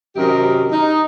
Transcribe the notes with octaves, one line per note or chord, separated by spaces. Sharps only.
F#2 C3 D#3 G4 A#4 D#5
D#4